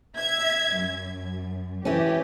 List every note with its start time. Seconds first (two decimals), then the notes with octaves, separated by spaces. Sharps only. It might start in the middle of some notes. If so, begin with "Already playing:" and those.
0.16 E5 G#6
0.77 F#2
1.85 E3 C#4 G4